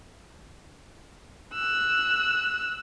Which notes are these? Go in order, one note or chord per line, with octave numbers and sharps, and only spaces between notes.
E6 F#6